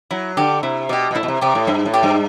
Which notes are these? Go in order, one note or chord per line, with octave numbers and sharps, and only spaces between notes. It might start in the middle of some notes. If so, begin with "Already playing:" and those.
F#3 E4
D3 G4 D5
C3 E4
B2 G4 D5
B2
A2 E4
B2
C3
C3 G4 D5
A2
G2 E4
A2
G4 D5
G2